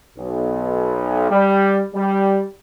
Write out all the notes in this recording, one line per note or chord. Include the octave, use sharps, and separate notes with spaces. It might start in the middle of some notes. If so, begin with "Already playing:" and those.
B1
G3
G3